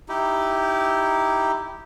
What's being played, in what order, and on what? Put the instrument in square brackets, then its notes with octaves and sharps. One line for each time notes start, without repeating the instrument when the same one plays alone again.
[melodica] D#4 E4 G4